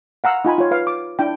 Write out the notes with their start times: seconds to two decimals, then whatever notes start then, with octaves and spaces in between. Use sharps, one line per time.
0.24 F5 F#5 A#5 E6
0.45 D#4 F4 G#5 B5
0.58 F4 C#5
0.71 B4 F5
0.87 D6
1.19 D4 E4 G5